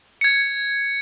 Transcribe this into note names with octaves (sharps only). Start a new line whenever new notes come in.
G#6 C#7